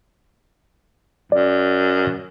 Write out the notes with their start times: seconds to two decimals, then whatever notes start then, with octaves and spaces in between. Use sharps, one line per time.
1.32 F#2 D5